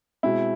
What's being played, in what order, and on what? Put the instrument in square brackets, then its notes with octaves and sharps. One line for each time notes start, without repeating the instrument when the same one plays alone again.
[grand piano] B2 G#3 C4 E4